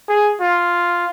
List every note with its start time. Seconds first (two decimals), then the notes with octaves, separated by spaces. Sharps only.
0.09 G#4
0.41 F4